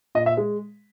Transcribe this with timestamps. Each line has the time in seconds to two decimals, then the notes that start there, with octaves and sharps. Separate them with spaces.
0.15 A#2 D#5
0.26 E5
0.37 G#3